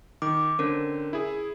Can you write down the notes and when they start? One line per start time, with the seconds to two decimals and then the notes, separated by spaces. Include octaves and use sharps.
0.22 D#3 D6
0.59 D3 C#4 A#4 C5
1.13 E4 G#4